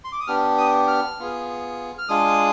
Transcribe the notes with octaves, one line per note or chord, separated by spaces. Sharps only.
C6
D6
D#6
B3 D4 G4 F6
D#6
F6
B3 F4 G#4
F6
G#3 D4 F4 G#4 D#6